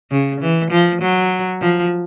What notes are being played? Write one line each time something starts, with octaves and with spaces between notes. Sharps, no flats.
C#3
E3
F3
F#3
F3